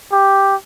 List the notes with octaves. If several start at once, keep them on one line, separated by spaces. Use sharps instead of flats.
G4